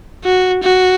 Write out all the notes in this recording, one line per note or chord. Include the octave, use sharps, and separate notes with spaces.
F#4
F#4